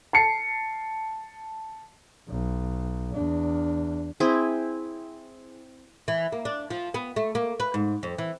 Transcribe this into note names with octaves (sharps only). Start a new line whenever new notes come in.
A5 C7 C#7
B1
E2 D4
C4 E4 G#4
E3
A#3
D4
F3
B3
A3
A#3
B4
G#2
F2
E3